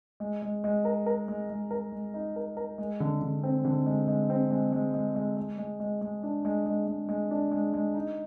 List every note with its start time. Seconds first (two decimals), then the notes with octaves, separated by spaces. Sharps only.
0.20 G#3
0.42 G#3
0.64 G#3
0.85 A#4
1.06 A#4
1.28 G#3
1.50 G#3
1.71 A#4
1.92 G#3
2.14 D#4
2.36 A#4
2.57 A#4
2.78 G#3
3.00 D3
3.22 D3
3.43 C4
3.65 D3
3.86 G#3
4.08 G#3
4.30 C4
4.51 G#3
4.72 G#3
4.94 G#3
5.15 G#3
5.37 G#3
5.58 G#3
5.80 G#3
6.01 G#3
6.23 D4
6.45 G#3
6.66 G#3
6.87 G#3
7.09 G#3
7.31 D4
7.52 G#3
7.74 G#3
7.94 D#4